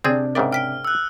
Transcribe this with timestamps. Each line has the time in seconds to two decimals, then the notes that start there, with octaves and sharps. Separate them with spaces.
0.04 C3 C4 D4 G#4 D5 G6 A6
0.35 G#2 C#3 A#4 D5 E5 G5
0.52 G5 F6 B6 D7
0.85 E6 F#6